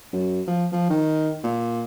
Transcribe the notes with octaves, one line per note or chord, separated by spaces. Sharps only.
F#2
F3
F3
D#3
A#2